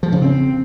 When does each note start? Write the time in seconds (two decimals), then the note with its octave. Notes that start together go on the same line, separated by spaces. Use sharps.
0.03 F3
0.12 C#3
0.22 C4